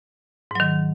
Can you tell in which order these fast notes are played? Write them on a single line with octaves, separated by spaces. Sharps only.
G#2 F#3 D#3